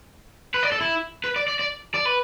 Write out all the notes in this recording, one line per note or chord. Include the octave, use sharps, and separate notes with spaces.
B4
D5
A4
E4
B4
D5
D5
D5
D5
B4